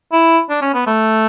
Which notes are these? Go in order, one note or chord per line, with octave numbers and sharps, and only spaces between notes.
E4
D4
C#4
B3
A3